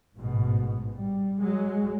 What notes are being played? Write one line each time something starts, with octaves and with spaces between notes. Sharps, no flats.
A1 G#2 B2
G3
F#3 G#3